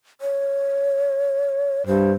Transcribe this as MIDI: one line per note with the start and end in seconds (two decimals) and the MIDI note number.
0.21 1.83 73
1.87 2.14 43
1.87 2.12 72